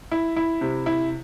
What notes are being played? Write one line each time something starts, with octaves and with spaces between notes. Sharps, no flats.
E4
E4
C3
E4